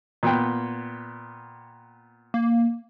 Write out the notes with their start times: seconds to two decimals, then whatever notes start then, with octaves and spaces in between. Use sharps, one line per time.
0.23 A#2 B3 G5
2.34 A#3